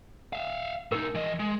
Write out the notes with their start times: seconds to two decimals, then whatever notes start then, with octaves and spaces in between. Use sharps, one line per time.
0.33 E5 F5
0.92 A2 D#4 A#4
1.15 E3 D#5
1.40 G#3